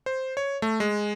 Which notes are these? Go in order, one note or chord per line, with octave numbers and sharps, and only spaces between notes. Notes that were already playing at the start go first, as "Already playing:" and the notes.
C5
C#5
A3
G#3